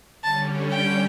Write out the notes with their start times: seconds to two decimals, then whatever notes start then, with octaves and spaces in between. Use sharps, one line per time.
0.23 D3 G3 C#4 A5
0.70 G5